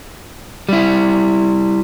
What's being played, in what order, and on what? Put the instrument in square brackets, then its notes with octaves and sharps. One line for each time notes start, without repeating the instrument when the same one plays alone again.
[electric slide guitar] G3 E4